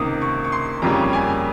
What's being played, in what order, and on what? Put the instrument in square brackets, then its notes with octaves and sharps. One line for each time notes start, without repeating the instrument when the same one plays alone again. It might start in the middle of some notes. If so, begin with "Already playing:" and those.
Already playing: [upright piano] C#2 C3 D#3 A#3 D#6
C#6
C#6
C6
F2 C#3 G3 A#3 C#4 A#5
G#5